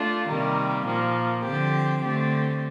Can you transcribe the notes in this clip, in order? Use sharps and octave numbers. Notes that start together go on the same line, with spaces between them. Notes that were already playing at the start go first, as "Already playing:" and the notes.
Already playing: A3 D4 F4
C3 D#3 G3 A#3
A#2 F3 A#3
D3 F3 C4 G4
D3 A3 C4 G4